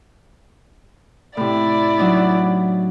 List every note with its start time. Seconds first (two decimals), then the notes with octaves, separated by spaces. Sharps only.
1.37 A2 C3 E4 D5
1.98 F#3 D4 D#4